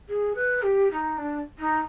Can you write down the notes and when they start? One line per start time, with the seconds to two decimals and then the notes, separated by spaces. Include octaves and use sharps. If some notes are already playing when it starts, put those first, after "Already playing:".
0.09 G#4
0.35 B4
0.62 G4
0.91 D#4
1.17 D4
1.58 D#4